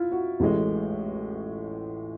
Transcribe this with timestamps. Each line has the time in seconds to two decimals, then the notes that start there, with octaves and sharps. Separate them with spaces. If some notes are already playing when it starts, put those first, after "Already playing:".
Already playing: E4 F4
0.12 F#4
0.40 A1 A2 E3 G#3